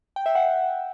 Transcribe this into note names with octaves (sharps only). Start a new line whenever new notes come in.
G5
E5
F#5